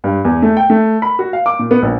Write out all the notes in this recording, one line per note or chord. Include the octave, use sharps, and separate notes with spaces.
G2
E2
A3
G5
A3
B5
F#4
F5
D6
A#2
B3
A#1